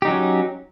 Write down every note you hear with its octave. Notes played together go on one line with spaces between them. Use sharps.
F#3 C#4 D#4 G4